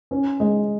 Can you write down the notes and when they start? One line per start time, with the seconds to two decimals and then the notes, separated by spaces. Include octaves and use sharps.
0.11 C#4
0.40 G#3